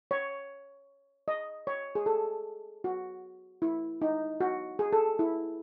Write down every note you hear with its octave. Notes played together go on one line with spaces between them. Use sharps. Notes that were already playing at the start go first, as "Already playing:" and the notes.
C#5
D#5
C#5
G#4
A4
F#4
E4
D#4
F#4
G#4
A4
E4